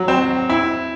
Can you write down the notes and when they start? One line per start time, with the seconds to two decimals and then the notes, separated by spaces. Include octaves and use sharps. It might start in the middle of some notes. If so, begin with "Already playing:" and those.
Already playing: F#3
0.08 C4
0.50 E4